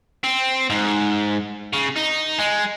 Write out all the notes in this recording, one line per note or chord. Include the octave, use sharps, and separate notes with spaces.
C4
G#2
C#3
D#4
G#3